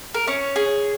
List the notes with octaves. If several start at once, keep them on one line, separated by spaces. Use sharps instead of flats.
A#4
C#4 C#5
G#4